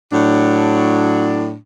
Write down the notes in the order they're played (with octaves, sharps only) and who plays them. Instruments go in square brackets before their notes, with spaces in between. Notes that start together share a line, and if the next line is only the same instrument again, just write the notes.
[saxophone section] A2 F#3 D4